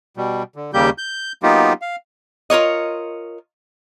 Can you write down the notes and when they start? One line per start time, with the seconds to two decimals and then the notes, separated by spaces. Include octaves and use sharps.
0.17 B2 G3
0.56 D3
0.73 D#2 C#3 G3 A#3 G4 G6
0.98 G6
1.43 F#3 A#3 B3 D#4 F4 G4
1.82 F5
2.50 F4 A#4 C#5 D#5